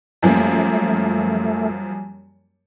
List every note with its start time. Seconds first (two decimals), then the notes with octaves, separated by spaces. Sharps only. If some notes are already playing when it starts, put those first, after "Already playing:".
0.23 F#2 F3 G3 A3 A#3 G#5